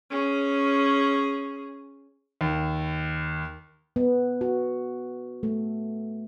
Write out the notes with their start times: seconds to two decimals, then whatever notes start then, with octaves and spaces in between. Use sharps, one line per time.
0.11 C#4 G#4
2.41 D#2
3.96 B3
4.41 F#4
5.43 A3